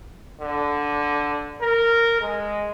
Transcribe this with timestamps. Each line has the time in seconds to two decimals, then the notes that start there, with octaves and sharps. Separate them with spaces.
0.41 D3
1.62 A#4
2.22 G#3